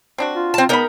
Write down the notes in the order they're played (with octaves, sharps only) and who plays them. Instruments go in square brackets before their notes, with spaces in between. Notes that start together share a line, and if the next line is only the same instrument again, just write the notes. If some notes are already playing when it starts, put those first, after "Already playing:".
[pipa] C4 D4 F#4
[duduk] F4
[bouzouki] C4 A5
[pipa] G#3 D5 B5 [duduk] B3 [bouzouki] D#4 A#4